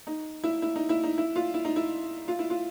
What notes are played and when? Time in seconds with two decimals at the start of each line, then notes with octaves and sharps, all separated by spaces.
0.07 D#4
0.44 E4
0.62 E4
0.76 D#4
0.89 E4
1.04 D#4
1.18 E4
1.36 F4
1.54 E4
1.65 D#4
1.76 E4
2.28 F4
2.39 E4
2.50 F4